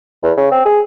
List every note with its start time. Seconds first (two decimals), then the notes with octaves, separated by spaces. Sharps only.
0.23 E2
0.37 C#3
0.51 C4
0.65 G#4